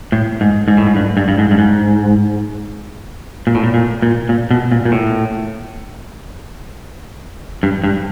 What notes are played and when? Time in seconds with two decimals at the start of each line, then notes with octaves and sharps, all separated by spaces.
0.12 A2
0.41 G#2
0.68 G#2
0.77 A2
0.87 G#2
0.96 G2
1.17 G2
1.28 G2
1.38 G#2
1.51 G2
1.58 G#2
3.47 A#2
3.55 A2
3.63 A#2
3.74 A#2
4.02 A#2
4.29 A#2
4.51 B2
4.72 A#2
4.85 A#2
4.92 A2
7.63 G2
7.84 G2